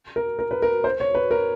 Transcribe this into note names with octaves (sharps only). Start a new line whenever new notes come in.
A#4
A#4
B4
A#4
C5
C#5
B4
A#4